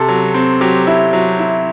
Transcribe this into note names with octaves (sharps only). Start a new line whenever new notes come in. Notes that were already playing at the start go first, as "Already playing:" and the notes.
Already playing: C3 A4
F#3
C4
F#3 G4
E4
F#3
E4